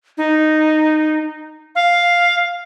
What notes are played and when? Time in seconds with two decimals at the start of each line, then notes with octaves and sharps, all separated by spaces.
0.18 D#4
1.75 F5